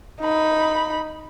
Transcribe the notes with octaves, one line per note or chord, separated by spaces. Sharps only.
D#4 B5